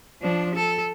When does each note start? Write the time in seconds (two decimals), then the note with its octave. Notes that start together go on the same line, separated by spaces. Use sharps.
0.22 F3 D4
0.54 A4